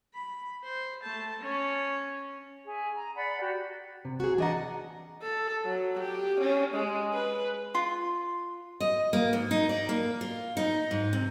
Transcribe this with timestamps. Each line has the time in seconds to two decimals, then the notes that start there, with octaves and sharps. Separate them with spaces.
0.13 B5
0.63 C5
1.03 A3 A5
1.40 C#4
2.65 G#4 E5
2.95 A#5
3.16 D5 F#5 B5
3.40 F#4 G4
4.05 C3
4.20 F#4 G#4
4.38 E3 D4 D#5 F#5 A#5
5.23 A4
5.65 F#3
6.00 G4
6.41 C#4
6.75 G#3
7.14 B4
7.75 F4
8.80 D#5
9.13 A#3
9.33 G#2
9.51 D#4
9.69 D5
9.89 A#3
10.21 F4
10.57 D#4
10.91 G#2
11.13 C3